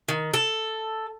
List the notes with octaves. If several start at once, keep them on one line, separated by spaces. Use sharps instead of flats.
D#3
A4